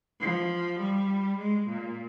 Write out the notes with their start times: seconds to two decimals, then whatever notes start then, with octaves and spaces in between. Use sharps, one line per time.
0.20 F3
0.79 G3
1.38 G#3
1.68 A#2